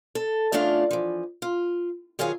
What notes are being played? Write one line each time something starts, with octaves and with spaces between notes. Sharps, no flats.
A4
E2 C#3 A3 D4 F4 F5
E3 F3
F4
D#3 F#3 F4 G#4 C#5 F5